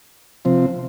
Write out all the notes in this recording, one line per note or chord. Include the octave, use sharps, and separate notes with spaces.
C3 F3 C4